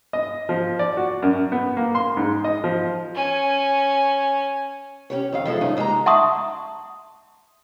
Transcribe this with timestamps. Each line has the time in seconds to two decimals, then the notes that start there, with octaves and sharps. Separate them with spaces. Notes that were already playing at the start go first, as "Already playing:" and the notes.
0.13 D#5
0.49 F3
0.79 D5
0.97 F#4
1.22 F#2
1.52 B3
1.77 A#3
1.95 C6
2.17 G#2
2.44 D#5
2.64 F3
3.14 C#4 G#5
5.10 C#4 G4 C#5
5.33 F2 D#3 F5
5.45 F3 G#3 E4 A4
5.61 G2 C#3 D#4 G#5
5.77 D#2 G#3 G4 E5 A#5
6.06 E5 F#5 A5 C6 C#6 D#6